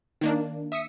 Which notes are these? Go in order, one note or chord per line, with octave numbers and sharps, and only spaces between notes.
D#3 A#3 D4
E5 D#6 B6 C#7